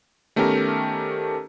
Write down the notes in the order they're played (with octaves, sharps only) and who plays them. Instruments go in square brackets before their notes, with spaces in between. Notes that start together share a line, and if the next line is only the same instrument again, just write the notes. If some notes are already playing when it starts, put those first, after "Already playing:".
[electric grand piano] D#3 A3 B3 C#4 G4 A#4